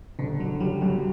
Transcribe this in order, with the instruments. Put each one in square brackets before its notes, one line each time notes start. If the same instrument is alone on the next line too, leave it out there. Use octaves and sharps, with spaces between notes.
[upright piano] F#1 [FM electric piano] D3
[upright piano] D3 [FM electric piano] F#3
[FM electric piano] F#3 [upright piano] G3
[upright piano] F#2 [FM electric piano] F#3